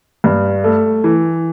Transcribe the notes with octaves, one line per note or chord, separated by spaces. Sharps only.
G2
A3
E3